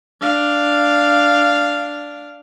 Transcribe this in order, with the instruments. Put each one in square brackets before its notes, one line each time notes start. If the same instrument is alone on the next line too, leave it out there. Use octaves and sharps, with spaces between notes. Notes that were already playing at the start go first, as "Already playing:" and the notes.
[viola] D4 F5